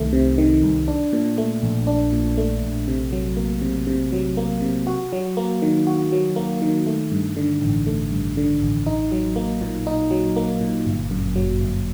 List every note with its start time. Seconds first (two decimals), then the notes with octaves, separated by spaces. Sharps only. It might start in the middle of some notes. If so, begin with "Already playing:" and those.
Already playing: C2 C3 D#3 A3
0.13 C3
0.38 D#3
0.63 C2
0.88 D4
1.13 A#2
1.38 A3
1.63 A#1
1.87 D4
2.13 A#2
2.38 A3
2.63 A#1
2.88 C3
3.12 F#3
3.37 A#3
3.62 C3
3.87 C3
4.13 F#3
4.37 A#3
4.62 C3
4.87 F#4
5.13 F#3
5.37 A#3
5.62 D#3
5.87 F#4
6.12 F#3
6.36 A#3
6.62 D#3
6.87 A3
7.12 G2
7.36 D3
7.62 A1
7.87 A3
8.12 G2
8.37 D3
8.62 A1
8.86 D#4
9.12 F#3
9.36 A#3
9.61 A#2
9.87 D#4
10.11 F#3
10.36 A#3
10.61 A#2
10.86 G1
11.11 F#2
11.35 F#3
11.61 G1